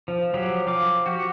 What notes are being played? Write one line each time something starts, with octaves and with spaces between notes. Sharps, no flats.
F3
F3 F#3 G4
F3 F5 D6
F#4 G4